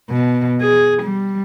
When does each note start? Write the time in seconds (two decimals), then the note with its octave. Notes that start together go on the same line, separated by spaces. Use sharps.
0.11 B2
0.61 G#4
1.03 G3